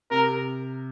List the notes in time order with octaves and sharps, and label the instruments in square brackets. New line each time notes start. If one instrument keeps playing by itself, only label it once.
[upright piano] C3 [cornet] A#4